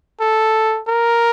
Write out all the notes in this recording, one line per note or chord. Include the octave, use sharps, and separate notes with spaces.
A4
A#4